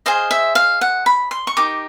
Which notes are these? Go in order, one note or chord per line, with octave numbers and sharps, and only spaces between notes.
G#4 C5 D#5 F5
E5
F5
F#5
B5
C6
C#6
D#4 G4 A#4 D6